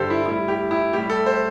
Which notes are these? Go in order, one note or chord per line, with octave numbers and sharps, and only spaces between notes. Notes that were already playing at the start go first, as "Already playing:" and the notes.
Already playing: G2 D3 G3 G4 A4 C5
E4
A2 G3 E4
G4
E4
A2 G3 G4
A4
C5